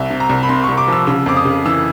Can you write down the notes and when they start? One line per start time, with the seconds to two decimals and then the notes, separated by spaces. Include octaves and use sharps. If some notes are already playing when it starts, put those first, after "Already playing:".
Already playing: C2 E5
0.10 C3
0.20 A#5
0.29 C2
0.43 B5
0.49 C3 C6
0.64 C2 C#6
0.78 D6
0.88 F3 E6
1.07 C#3 E6
1.26 F2 D6
1.37 D#6
1.45 C#3
1.65 E3 E6